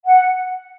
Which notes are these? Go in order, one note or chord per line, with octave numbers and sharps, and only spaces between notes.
F#5